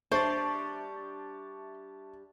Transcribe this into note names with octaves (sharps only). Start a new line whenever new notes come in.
G3 D4 C5 E5 A5 C#6 A6